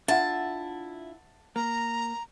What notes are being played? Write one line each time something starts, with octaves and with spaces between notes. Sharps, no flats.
D4 E4 F4 E5 F#5 A5
A#3 A#5